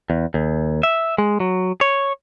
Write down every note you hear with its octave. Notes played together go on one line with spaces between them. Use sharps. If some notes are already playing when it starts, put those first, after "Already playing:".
E2
D#2
E5
G#3
F#3
C#5